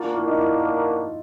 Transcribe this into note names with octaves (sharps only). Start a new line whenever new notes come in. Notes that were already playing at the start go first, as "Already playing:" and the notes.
Already playing: A#3 D4 F4 F#4 A#4
E4
D#4
E4